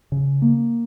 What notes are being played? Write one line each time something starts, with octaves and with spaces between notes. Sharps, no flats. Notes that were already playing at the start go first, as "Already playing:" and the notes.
C#3
A#3